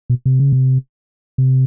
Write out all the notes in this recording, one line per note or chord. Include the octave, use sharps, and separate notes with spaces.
B2
C3
C#3
C3
C3